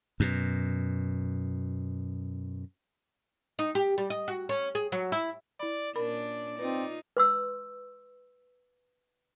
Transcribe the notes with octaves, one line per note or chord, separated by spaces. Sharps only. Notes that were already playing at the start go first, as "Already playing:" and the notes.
F#2 B2
D#4
G4
G3
D#5
F#4
C#4
G#4
F#3
E4
E4 D5 B5
A#2 C#4 D4 A#4 D5 B5
C4 D#4 F4 B4
B4 C6 E6